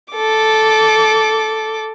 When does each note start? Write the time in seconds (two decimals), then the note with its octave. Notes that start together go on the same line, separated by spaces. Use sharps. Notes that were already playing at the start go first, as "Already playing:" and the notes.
0.14 A4 D6